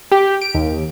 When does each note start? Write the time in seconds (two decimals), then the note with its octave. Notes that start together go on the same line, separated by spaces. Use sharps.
0.12 G4
0.42 D7
0.55 D#2